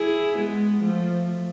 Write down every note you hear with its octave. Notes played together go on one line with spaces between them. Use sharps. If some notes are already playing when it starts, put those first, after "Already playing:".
Already playing: E4 G#4
G#3 B3
F3 A3